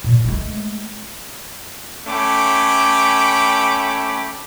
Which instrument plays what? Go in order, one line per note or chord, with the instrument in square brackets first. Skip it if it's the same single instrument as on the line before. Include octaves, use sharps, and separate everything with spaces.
[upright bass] A#2
G#3 A3
[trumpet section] A3 C#4 G5 B5 D6